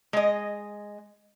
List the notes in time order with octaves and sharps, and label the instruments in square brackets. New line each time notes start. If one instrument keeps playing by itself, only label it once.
[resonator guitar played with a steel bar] G#3 D#5